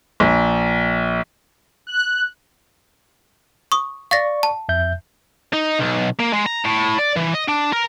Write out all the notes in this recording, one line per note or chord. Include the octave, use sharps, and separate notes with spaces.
A#1
F#6
C#6 D#6
D5 F5 C#6 A6 A#6
A5
F2 E5 G6
D#4
B1
A#3
G#3
A#5
A2
D5
E3
D#5
D4
A#4